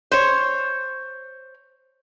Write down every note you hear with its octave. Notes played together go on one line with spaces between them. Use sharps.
C5 C#5